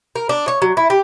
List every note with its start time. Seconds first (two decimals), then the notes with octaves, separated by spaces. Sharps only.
0.16 A#4
0.29 D4
0.48 C#5
0.62 F#3
0.77 E4
0.90 G4